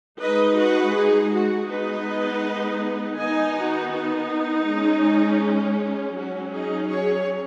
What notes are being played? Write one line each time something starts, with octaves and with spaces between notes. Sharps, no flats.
G#3 D#4 B4 D#5
F#4 B4
D#4 G#4
F#4
G#3 B3 D#4 B4 D#5
D#3 B3 D#4 D#5 G#5
F#4
D#4
G#3 C#4
F#3 C#4 F#4
D#4 G#4
G#4 C#5